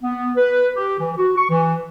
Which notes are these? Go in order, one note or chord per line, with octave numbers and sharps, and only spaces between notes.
B3
B4
G4
E3
F#4
C#6
E3